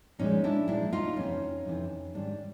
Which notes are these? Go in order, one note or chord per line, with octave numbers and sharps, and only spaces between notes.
A#2 F3 G#3 C#4 D#4
D4 E4
A#2 F3 G#3 D4 E4
D#4 F4
F2 C3 E3 C#4 D#4
F2 C3 E3
G#2 D#3 G3 D4